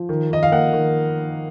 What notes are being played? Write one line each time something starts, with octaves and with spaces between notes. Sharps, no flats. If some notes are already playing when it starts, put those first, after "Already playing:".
Already playing: F3
D#3
D#3 D#5
F5
A#3 F#5
D#3